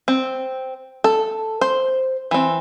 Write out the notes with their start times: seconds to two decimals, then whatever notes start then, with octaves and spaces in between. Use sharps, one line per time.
0.08 C4
1.04 A4
1.61 C5
2.31 E3 C4